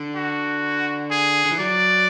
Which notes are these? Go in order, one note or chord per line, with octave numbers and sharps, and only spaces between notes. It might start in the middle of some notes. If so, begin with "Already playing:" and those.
Already playing: D3
F#4
G#4
D3
E3
F#3 D5